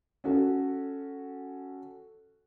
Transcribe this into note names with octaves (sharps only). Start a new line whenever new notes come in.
C#4 F#4 A4